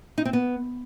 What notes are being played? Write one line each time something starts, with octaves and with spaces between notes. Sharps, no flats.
D#4
C4
B3